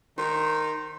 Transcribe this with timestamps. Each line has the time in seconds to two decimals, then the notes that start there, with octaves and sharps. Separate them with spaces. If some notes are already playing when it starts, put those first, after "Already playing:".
0.18 D#3 C5